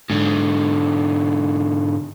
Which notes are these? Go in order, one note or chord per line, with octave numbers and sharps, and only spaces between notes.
G#2 D3